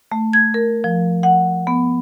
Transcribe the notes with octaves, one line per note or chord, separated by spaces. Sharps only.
A3
G#6
A#4
F3
F#5
B3